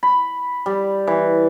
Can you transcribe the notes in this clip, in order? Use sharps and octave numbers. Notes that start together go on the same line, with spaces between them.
B5
G3
E3